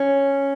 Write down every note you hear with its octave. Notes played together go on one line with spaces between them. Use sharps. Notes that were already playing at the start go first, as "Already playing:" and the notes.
Already playing: C#4